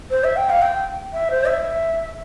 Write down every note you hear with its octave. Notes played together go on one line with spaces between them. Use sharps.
C5
E5
G5
F5
G5
E5
C5
E5